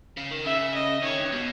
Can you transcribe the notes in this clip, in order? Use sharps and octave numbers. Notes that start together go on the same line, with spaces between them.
C#3
D#3
C#3 E5
D#5
D#3 C#5
G2
B2